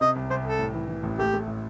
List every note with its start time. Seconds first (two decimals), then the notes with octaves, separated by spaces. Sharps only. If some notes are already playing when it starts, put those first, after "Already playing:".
0.01 C3 D#5
0.16 C2
0.30 C2 C5
0.44 C2 A4
0.59 A2
0.74 E3
0.88 E3
1.03 A1
1.19 A3 G4
1.33 A3
1.48 A2